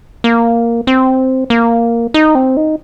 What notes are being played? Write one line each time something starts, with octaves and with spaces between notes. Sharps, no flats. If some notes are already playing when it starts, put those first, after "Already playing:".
A#3
C4
A#3
D#4
C4
D#4